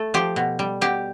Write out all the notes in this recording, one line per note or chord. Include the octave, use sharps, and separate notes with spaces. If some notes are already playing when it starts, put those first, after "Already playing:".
Already playing: A3
F3 G4
B2
G3
B2 G4